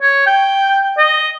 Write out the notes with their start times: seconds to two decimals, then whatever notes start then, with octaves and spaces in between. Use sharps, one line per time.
0.02 C#5
0.26 G5
0.98 D#5